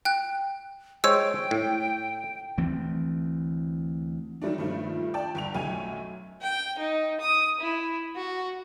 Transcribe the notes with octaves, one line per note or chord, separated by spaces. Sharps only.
G5 F#6
G#3 C5 C#5 G5 E6
A2
D2 E3 A3 C4
D#3 F#3 G3 A3 D4
G2 A#2 D#3 F3 A3
D5 G5 A5
G1 G5 F7
B1 F#2 A3 G#5
G5
D#4
D#6
E4
F#4